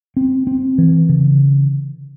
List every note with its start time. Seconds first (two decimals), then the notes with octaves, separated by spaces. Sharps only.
0.17 C4
0.47 C4
0.78 E3
1.09 C#3